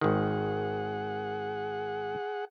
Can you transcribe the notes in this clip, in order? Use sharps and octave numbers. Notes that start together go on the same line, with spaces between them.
G#1 D#3 G#4 F#5